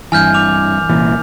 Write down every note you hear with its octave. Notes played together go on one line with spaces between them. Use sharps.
G2 E3 G#5 F6 G6
D6 F7
C2 A#2 E3